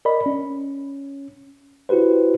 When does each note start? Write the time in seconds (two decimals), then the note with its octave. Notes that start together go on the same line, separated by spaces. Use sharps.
0.05 A#4 D5 D#5 B5
0.26 C#4
1.89 E4 F#4 G4 B4 C5